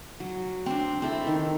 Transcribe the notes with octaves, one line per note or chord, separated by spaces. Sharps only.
F#3
C4 D4
C4 E4 A4 E5
D#3